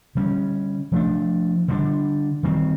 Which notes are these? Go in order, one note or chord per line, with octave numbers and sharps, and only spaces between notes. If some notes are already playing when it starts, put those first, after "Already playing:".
D3 G3 A#3 C#4
F3 A3 D4
D3 G3 B3 D4
D#3 G3 C4